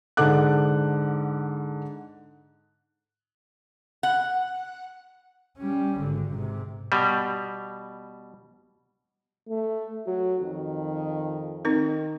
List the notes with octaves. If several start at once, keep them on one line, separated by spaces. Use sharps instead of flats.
G#2 D3 A4 F#5 D6 F#6
F#5
G3 C#4
G#1 D3
G#2 C3
B2 G3
A3
F#3 F#4
F2 D#3
D#3 C4 D#4 A#4